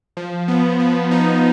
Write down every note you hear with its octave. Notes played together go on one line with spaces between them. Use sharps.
F3
B3
F3
D#4